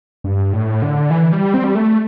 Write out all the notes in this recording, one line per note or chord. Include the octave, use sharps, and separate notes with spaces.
G2
A2
D3
E3
G3
C4
G3
A3